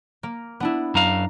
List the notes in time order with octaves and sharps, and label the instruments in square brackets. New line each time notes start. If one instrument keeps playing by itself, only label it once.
[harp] A#3
B3 D4 E4
[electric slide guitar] F#2 F5 [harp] A#5